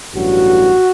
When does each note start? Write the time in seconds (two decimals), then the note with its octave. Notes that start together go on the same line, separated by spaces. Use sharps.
0.14 A1 G2 F#3 F#4